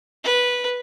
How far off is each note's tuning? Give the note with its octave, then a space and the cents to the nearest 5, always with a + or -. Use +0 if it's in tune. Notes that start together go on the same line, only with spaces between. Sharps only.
B4 -10